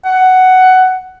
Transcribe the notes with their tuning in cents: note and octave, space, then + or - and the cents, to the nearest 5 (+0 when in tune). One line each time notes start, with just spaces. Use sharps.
F#5 +10